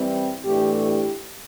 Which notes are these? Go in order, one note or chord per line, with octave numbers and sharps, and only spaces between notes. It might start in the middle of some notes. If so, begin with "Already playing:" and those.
Already playing: E3 G3 C4
A2 E3 A3 D4 G4
G4